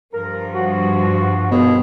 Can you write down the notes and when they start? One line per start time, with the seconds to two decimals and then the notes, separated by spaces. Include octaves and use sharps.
0.13 G2 F3 A#4
0.54 F#4
1.51 D#2 B2 G#4